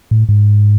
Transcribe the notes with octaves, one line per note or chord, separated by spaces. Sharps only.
A2
G#2